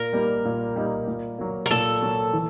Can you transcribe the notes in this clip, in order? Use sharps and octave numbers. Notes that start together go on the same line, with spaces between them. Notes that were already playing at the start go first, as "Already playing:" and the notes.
Already playing: A#2 A#4
G3 A#3 D#4
A#2
G3 A#3 D#4
A#2
F#3 A#3
A#4
A#2 A4
F#3 A#3
E3